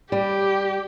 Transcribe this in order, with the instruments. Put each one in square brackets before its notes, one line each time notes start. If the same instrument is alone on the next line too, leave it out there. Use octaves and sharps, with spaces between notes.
[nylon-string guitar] G3 [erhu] G4